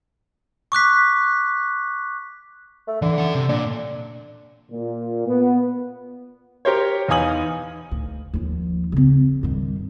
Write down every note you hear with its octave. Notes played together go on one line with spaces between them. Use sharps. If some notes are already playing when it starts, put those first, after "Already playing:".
C#6 D6 F#6 B6
A3
D3 E3
C#4 F#5
C3
A#2 D4
A#2
B3
G4 A#4 C5 C#5
E2 D#4 F5 G#5 D#6 F#7
D2
D#2 F3
C#3 C4
G2 D#3